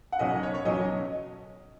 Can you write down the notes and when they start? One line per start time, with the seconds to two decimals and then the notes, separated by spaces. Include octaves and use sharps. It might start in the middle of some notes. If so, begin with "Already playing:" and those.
0.12 F#5
0.19 B1 B2 F#3 C#4 D#5
0.43 C#5
0.54 C#5
0.65 B1 B2 F#3 C#4 D#5